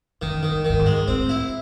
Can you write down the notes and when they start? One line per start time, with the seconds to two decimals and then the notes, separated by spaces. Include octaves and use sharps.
0.22 F#2 D#3
0.43 D#3
0.51 G2
0.65 G2 D#3
0.79 G#2
0.86 G#3
1.08 A2 C4
1.29 E4